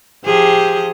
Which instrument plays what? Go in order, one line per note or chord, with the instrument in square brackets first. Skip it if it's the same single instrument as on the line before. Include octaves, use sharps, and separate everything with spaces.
[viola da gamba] F3 G4 G#4